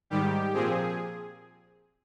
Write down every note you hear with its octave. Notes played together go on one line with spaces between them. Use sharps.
G#2 D#3 G3 G4
A#2 F3 C4 G#4